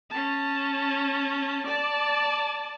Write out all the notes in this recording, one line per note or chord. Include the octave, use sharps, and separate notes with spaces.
C#4 A5
D5 A5